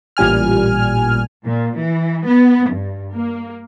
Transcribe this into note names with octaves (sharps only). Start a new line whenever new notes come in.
A1 A#2 G3 G#5 F6
A#2
E3
B3
G2
A#3